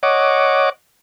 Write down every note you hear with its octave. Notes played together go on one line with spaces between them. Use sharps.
C#5 D#5 F#5 D6